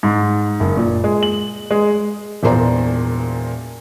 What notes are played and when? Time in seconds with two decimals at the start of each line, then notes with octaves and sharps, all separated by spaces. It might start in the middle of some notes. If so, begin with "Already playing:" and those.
0.03 G#2
0.60 F#1
0.77 A#2
1.04 G#3
1.23 F#7
1.71 G#3
2.43 E1 E2 A#2 C5 D5 A#5